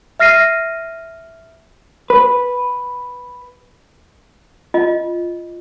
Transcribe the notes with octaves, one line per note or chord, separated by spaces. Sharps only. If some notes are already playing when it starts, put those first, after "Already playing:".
E5 F6 A#6 C7 D#7
B4
F4 D#5